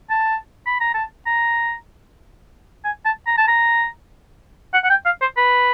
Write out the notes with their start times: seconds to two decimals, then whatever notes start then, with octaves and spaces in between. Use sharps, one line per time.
0.10 A5
0.66 B5
0.81 A#5
0.94 A5
1.26 A#5
2.84 G#5
3.05 A5
3.27 A#5
3.38 A5
3.48 A#5
4.73 F#5
4.84 F#5
4.90 G5
5.06 F5
5.21 C5
5.37 B4